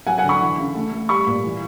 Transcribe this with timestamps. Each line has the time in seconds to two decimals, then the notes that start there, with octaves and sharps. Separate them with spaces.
0.07 F#3 F#5 G#5
0.18 F#5 G#5
0.24 D3
0.29 B5 C#6
0.40 E3
0.58 C#3
0.75 A3
0.92 A3
1.09 G3 B5 C#6
1.27 A#2
1.44 E3